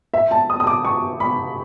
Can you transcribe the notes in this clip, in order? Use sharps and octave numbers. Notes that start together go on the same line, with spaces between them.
E5
A5
D#6
D#6
D6
C#6
B5